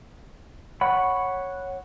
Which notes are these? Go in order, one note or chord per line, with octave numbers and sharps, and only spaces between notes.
C#5 F#5 B5